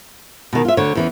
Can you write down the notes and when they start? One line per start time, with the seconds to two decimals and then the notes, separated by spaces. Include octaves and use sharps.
0.53 B2 D#3
0.65 F4 E5
0.77 D2 D3 C#5
0.95 E2 E3 C#4